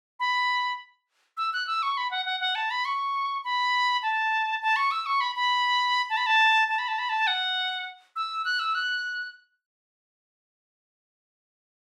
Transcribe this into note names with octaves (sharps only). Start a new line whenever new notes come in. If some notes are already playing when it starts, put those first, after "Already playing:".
B5
E6
F#6
E6
C#6
B5
F#5
F#5
F#5
A5
B5
C#6
B5
A5
A5
C#6
E6
C#6
B5
B5
A5
B5
A5
A5
B5
A5
B5
A5
F#5
E6
F#6
E6
F#6